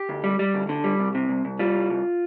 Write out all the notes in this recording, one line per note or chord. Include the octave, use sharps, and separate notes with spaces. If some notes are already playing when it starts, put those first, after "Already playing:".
Already playing: G4
D2
G3
G3
D2
D3
G3
C2
C3
C2
C2
G3 F4
C2
C2